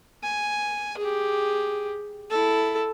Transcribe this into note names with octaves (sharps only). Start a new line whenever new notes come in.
G#5
G4 G#4
E4 A4